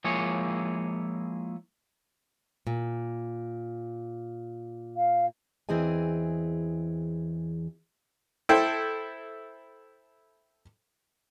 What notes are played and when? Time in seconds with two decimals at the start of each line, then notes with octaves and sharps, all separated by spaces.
0.04 F3 G#3 A#3 E4 G#4 C#5
2.67 A#2
4.97 F5
5.69 E2 E3 C4 G#4 D#5 G#5
8.49 E4 A4 C5 G5